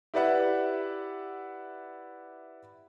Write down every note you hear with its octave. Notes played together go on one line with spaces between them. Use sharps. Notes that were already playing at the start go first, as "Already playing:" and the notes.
E4 G4 B4 D5 E5 F#5